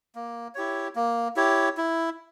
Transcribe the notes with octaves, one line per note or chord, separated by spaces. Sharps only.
A#3
E4 G4 C#5
A#3
E4 G4 C#5
E4